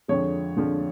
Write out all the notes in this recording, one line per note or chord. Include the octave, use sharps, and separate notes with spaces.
F2 D3 F3 G#3 C#5
F2 D3 F3 G#3